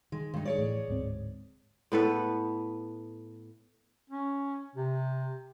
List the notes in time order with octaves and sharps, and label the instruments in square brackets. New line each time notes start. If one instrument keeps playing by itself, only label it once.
[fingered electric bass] D#3 [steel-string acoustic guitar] G#3
[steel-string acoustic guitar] G2 D#4 [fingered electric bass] D#3 G#3
[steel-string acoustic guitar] G#4 C#5 D5
[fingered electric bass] A2 E3 A3
D1 G#2 C4
[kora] A2 B3 A4 B4
[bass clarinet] C#4
C3